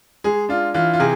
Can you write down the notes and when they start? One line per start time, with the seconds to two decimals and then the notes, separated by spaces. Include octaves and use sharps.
0.24 G#3 G#4
0.49 D4 F4
0.74 E3 F4
0.94 F4
0.99 C3 G#4